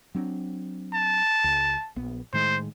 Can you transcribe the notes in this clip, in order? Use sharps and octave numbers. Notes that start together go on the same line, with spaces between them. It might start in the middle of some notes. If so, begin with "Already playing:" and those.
F#3 C4 D4
A5
C#2
A#1 B3
A2 D#3 G#3 C5